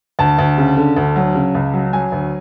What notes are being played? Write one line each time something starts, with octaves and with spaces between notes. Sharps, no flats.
D2 A5
D2
C#3
D3
D2
F#3
C#3
C#2
F#3
F#3 G#5
D2